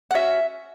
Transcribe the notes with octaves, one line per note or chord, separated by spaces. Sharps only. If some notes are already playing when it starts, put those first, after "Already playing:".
F#5
C#4 F#4 E5